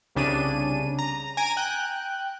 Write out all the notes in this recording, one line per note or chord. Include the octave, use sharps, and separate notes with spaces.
C2 C#3 D4 D#7
A#5
G#5 A#5 D7 D#7
G5 F#6